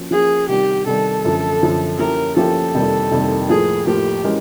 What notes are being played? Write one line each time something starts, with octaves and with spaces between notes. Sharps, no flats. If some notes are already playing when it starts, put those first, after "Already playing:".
Already playing: F3 A#3 C#4 F#4
F3 A#3 C#4 F#4 G#4
C3 D#3 G3 G4
C3 D#3 G3 A4
F#2 D3 F3 A3
F#2 D3 F3 A3
F3 A#3 C#4 E4 G4 A#4
F3 A#3 C#4 E4 G4 A4
F2 C3 D#3 G3 A#3
F2 C3 D#3 G3 A#3
A2 F3 A#3 G#4
A2 F3 A#3 G4
E3 G#3 C#4 F#4 A#4